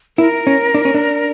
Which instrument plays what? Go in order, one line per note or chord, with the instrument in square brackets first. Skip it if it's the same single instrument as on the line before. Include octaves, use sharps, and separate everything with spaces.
[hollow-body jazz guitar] E4 [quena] A#4
[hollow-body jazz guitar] C#4
D4
C#4
D4